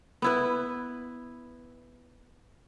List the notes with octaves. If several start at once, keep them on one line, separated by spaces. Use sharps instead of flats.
B3 E4 B4